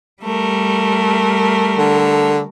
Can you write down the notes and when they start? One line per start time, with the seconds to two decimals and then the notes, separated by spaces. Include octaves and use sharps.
0.22 G3 A3 A#4
1.78 D3